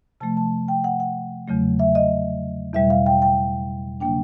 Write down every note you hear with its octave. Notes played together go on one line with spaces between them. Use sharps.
C3 F3 A3 A5
A5
G5
F#5
F#5
E2 C#3 F#3 A3
E5
D#5
E2 B2 G3 E5
F5
G5
G5
C#3 F#3 A#3 D4 G5